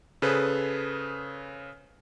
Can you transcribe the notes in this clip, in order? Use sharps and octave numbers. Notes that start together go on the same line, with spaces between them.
C#3 G#4 A4 B4 C5